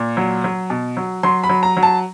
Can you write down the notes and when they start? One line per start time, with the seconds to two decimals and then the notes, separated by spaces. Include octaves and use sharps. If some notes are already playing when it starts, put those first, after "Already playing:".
Already playing: A#2
0.17 F#3
0.44 F#3
0.70 B2
0.97 F#3
1.23 F#3 C6
1.44 B5
1.49 F#3
1.63 A#5
1.77 F#3
1.83 A5